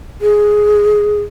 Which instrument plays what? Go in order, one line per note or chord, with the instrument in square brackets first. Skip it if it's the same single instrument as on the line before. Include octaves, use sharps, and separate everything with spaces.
[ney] G#4